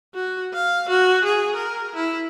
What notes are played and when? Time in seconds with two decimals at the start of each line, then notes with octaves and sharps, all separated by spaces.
0.15 F#4
0.53 F5
0.89 F#4
1.24 G#4
1.55 A#4
1.95 E4